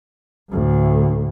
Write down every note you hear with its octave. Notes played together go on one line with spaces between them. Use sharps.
D2 A2